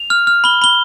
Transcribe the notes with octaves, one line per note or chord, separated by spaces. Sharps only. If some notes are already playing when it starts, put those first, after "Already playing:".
Already playing: F7
F6
F6
B5 G7
B5 G7